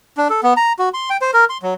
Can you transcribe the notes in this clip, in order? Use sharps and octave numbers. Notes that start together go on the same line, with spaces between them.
D4
A4
B3
A#5
F#4
C6
G5
C5
A#4
C6
F#3